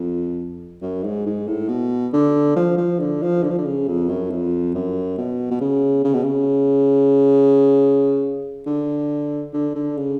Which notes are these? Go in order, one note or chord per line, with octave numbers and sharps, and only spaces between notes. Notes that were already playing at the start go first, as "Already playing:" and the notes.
Already playing: F2
F#2
G#2
G#2
A2
B2
D3
F3
F3
D3
F3
D3
F3
D3
C#3
F2
F#2
F2
F#2
B2
B2
C#3
C#3
B2
C#3
D3
D3
D3
C#3